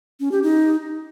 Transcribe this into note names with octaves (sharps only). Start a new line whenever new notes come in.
C#4
G4
D#4